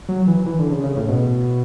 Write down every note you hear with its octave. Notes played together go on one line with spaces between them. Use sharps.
F#3
E3
E3
D3
C#3
C#3
A2
B2